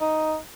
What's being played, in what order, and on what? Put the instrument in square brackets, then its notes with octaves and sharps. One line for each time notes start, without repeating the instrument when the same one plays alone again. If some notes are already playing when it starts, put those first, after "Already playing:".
[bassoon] D#4